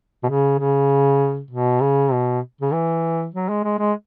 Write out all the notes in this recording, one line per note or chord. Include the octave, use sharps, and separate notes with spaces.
B2
C#3
C#3
B2
C#3
B2
C#3
E3
F#3
G#3
G#3
G#3